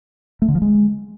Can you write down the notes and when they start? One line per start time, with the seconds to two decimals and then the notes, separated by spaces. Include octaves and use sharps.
0.42 A3
0.48 D3
0.55 F3
0.62 G#3